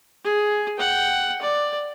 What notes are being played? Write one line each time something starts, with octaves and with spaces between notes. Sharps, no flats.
G#4
F#5 G5
D5